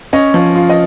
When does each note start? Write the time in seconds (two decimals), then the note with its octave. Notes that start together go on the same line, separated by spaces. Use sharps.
0.13 C#4 D#5
0.34 F3
0.56 F4
0.69 D#5